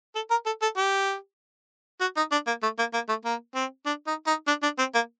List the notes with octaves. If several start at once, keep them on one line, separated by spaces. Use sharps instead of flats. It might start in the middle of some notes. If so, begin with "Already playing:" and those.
A4
A#4
A4
A4
G4
F#4
D#4
D4
A#3
A3
A#3
A#3
A3
A#3
C4
D4
D#4
D#4
D4
D4
C4
A#3